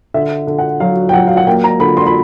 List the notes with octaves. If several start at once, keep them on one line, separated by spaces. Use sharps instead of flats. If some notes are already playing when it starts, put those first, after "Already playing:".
D3 E5
D3
F#5
F#3 F5
G5
F#3 F#5
F5
F#5
A#3 G5
A#5
D3 B5
C6
B5